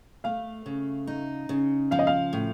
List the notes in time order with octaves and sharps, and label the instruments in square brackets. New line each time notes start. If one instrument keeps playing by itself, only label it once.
[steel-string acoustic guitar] A3 [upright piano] F5
[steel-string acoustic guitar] C#3
D#4
C#3
[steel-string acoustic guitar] F3 [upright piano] F5
[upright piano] D#5
F5
[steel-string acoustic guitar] A2